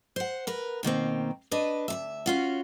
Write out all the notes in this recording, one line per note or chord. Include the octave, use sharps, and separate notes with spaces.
C5 F#5
A#4 B4
B2 D#3 A#3 C4
D4 B4 D#5
D2 C3 E5
C#4 F4 F#4